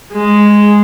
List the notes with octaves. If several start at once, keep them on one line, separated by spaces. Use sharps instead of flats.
G#3